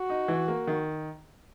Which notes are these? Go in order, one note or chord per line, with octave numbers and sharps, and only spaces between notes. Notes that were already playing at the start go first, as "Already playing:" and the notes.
Already playing: F#4
D#4
E3
A#3
D#3